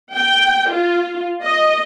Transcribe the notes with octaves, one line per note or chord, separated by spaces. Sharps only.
G5
F4
D#5